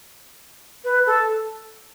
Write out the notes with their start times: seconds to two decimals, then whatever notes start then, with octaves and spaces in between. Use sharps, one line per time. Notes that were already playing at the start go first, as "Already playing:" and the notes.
0.84 B4
1.06 A4